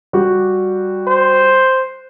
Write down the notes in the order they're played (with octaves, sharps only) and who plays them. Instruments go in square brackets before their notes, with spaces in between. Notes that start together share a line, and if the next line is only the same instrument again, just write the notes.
[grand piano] G3 F#4 G4
[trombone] C5